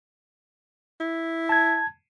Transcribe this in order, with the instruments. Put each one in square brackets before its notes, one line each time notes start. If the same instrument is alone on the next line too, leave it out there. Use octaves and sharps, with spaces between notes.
[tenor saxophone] E4
[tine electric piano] A5 G#6